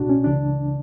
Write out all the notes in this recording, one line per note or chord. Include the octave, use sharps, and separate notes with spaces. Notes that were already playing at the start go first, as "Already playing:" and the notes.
Already playing: C#2 B2 D4 F#4
C#4
C#2 C#3 E3 D4